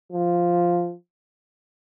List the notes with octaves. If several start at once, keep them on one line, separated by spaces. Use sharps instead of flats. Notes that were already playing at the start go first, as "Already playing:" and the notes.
F3